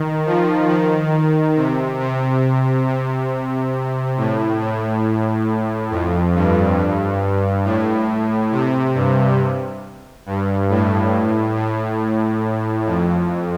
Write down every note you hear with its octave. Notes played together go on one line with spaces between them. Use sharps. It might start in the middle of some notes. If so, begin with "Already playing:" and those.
Already playing: D#3
F3
D#3
C3
C3
C3
A2
A2
F2
G2
A2
C3
G2
G2
A2
A2
F2